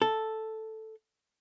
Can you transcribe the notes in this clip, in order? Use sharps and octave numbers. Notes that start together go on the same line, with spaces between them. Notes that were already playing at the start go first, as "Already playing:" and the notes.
A4